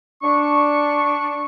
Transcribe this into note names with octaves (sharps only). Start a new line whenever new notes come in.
D4 C#6